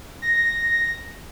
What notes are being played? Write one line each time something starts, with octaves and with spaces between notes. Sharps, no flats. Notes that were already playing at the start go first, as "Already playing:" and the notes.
A#6